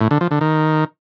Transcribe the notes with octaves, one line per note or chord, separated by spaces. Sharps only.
A2
D3
F3
D3
D#3